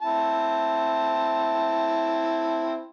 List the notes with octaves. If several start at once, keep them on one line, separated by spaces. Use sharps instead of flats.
C4 E4 A5